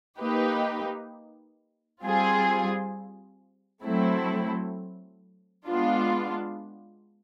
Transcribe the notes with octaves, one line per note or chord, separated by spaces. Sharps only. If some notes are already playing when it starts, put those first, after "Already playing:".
A#3 D#4 G4 B4
G3 C4 F4 G#4
F#3 A3 C4 E4 A4
G#3 B3 D4 F4